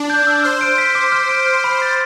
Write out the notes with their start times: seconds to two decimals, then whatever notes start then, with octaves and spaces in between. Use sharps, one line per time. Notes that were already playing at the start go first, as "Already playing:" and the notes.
Already playing: D4
0.10 G6
0.27 E6
0.43 C5 F6
0.61 D7
0.78 B6
0.95 D6
1.12 F6
1.29 D7
1.47 F6
1.64 B5
1.82 A6